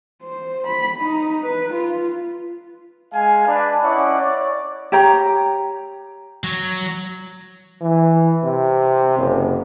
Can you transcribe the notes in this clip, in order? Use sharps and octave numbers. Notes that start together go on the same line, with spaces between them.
C5
B5
D#4
B4
F4
G#3 F5 G#5
D4 B4
C#4 E4 D5 D#5 F#5
C#5 D5
G4 C#5 G5 A#5
F#3
E3
C3
F#1